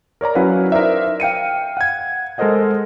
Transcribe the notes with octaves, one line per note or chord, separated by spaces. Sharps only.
A#4 C#5 D5 A#5
F#3 C#4 E4 B4 F5 F#5
D#4 A#4 C5 D5 E5
F5 G5 C#7 D#7
F#5 G#6
G#3 A4 A#4 C5 D#5 F#5